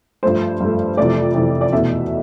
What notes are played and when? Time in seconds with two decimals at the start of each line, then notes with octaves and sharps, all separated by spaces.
0.23 G2 F3 A3 C5
0.60 G2 F3 A3
0.97 F2 C3 E3 A3 D5
1.35 F2 C3 E3 A3
1.61 D5
1.72 E2 B2 A3 E5